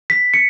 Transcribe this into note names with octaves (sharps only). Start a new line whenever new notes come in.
B6
C#7